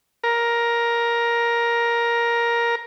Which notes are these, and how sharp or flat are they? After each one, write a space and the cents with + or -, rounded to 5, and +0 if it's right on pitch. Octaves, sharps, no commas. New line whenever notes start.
A#4 +10